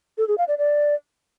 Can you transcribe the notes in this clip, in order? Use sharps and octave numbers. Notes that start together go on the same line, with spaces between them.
A4
G#4
F5
D5
D5